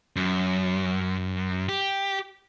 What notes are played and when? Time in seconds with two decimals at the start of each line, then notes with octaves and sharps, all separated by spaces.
0.16 F#2
1.69 G4